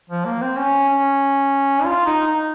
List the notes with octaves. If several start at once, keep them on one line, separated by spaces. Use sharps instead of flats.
F3
A#3
C4
C#4
C#4
F4
D#4
D#4